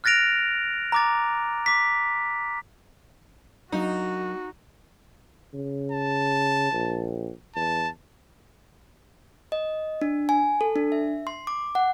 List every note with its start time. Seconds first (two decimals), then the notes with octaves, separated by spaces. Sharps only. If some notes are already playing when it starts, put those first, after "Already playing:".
0.04 F6 F#6 A6 A#6 D7 F7
0.92 A#5 D6 A6
1.66 D6 B6
3.72 F#3 A#3 D4 D#4 F#4
5.54 C#3
5.92 A5
6.73 A#1
7.56 E2 A5
9.52 D#5
10.01 D4
10.29 G#5
10.61 A4
10.76 D4
10.92 E5
11.27 C6
11.47 D6
11.75 F#5